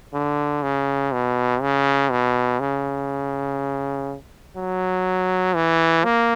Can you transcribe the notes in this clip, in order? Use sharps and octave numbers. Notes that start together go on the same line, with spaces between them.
D3
C#3
B2
C#3
B2
C#3
F#3
E3
A#3